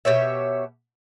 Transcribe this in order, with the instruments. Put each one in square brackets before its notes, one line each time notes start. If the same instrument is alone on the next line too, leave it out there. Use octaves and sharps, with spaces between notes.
[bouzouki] B2 G4 C#5 E5